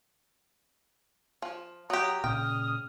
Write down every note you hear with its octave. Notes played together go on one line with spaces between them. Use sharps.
F3
F#3 G4 A#5 D#6
A#2 C#3 G5 D#6 F6